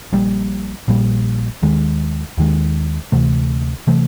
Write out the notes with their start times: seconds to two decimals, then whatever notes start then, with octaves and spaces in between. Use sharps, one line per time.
0.13 A#1 A#2 G3
0.88 A#1 A#2 G3
1.62 D#2 D#3 G#3
2.38 D#2 D#3 G#3
3.12 D2 C3 E3 A3
3.87 C3 E3 A3